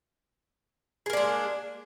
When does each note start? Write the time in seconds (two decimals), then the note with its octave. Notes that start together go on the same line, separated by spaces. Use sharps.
1.06 G#4
1.10 A#3
1.13 D4
1.17 G#3